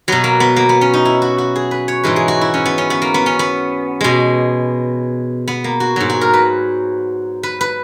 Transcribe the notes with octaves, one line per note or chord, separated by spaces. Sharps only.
B2 F#3 B3
A#3
B3
A#3
B3
C#4
D#4
E4
F#4
F#4
G#4
B4
C#5
G#2 E3 G#3 B4
G#4
F#4
E4
C#4
B3
C#4
B3
A#3
B3
C#4
B3
B2 G#3
B3
A#3
F#4
G#2 F#3
F#4
A#4
B4
B4
B4